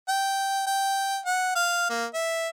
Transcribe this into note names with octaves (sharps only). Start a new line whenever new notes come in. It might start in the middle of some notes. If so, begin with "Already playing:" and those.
G5
G5
F#5
F5
A#3
E5